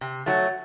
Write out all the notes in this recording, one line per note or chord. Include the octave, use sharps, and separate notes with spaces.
C3
F#3 A3